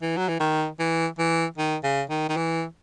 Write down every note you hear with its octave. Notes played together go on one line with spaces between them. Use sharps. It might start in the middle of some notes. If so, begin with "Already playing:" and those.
E3
F#3
E3
D#3
E3
E3
D#3
C#3
D#3
D#3
E3